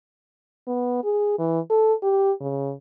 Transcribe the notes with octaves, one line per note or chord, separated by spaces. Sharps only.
B3
G#4
E3
A4
G4
C#3